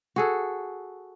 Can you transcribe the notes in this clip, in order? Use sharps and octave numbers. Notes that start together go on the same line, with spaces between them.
F#4 G#4 A4